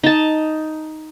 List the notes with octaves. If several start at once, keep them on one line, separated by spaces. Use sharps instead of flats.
D#4 A5